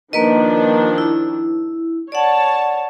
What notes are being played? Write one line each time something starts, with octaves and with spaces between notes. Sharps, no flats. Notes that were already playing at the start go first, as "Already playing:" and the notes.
D#3 F3 A#3 D4 B4 D#5
E4
C#5 D5 F#5 A5